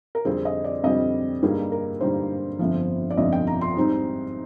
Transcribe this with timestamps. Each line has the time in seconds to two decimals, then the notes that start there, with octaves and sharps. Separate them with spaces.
0.15 A#4
0.25 F2 D3 G3 C4 G#4
0.45 D#5
0.64 D5
0.84 F2 D3 G3 C4 D#5
1.42 G2 D3 G3 A#3 D#4 G#4
1.72 A#4
2.01 G2 D3 G3 A#3 D#4 C5
2.59 G1 F2 D3 F3
3.11 D5
3.17 G1 F2 D3 F3 D#5
3.33 G5
3.47 A#5
3.61 C6
3.76 G#2 G3 C4 D#4